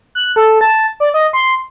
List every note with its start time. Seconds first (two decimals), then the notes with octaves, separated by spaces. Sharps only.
0.15 F#6
0.36 A4
0.61 A5
1.00 D5
1.14 D#5
1.33 C6